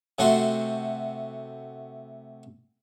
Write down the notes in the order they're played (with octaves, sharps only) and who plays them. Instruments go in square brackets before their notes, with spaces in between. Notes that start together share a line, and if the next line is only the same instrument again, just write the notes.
[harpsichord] C3 A3 F#4 C5 C6